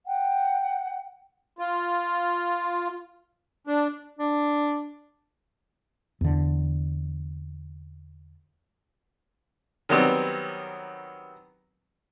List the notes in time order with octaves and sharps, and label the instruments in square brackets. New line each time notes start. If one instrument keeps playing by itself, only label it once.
[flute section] F#5 G5
[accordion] F4
D4
[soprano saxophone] D4
[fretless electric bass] E2 D3
[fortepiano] D#3 F#3 G3 B3 C4